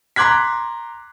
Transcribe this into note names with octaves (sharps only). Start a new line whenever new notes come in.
A#5 C6 D6 F#6 G#6 B6